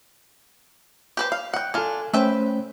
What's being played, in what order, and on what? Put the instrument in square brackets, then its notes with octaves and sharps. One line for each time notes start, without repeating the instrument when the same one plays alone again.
[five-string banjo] G4 B4 C5
F5
[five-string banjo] F#5 G5 [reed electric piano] F#6
[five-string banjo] D4 F4 [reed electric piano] A4 G#5
[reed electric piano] A3 C#4 C5 [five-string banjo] B4 E5 G5